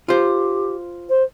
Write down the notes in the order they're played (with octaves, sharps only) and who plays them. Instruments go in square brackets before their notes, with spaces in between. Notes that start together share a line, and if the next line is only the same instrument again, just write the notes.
[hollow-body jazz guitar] F4 C5 [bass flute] G4
[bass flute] C5